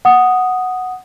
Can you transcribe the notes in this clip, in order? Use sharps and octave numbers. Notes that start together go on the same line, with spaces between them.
F#5 D#6